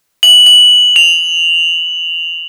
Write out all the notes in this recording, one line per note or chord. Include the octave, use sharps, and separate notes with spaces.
F#7
F#7
F7